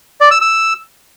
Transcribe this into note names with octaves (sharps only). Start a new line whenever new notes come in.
D5
E6
E6